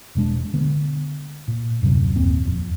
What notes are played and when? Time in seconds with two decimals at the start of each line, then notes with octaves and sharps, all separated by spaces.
0.15 E1 B2 G#3 D4
0.54 D3 B3
1.48 A#2
1.82 D#1 F#2 C3 F#3
2.16 G1 D#2 A#2 C4
2.47 F2